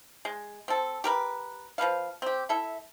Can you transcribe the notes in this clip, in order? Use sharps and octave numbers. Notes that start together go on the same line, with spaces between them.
G#3
C4 A4
G4 A#4 B4
F3 A#3 B4 F5
C4 G4
E4 A4 E5